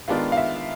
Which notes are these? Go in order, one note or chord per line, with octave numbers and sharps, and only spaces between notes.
D#3 G#3 B3 D4 F4 F5
F5
E5